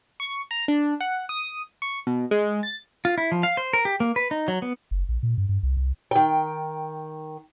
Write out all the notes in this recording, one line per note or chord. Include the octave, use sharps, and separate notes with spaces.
C#6
A#5
D4
F#5
D#6
C#6
B2
G#3
A6
F4
E4
F3
F5
C5
A#4
G4
A#3
B4
D#4
F#3
B3
F#1
A#1
A#2
G2
G2
C2
C2
D#3 G5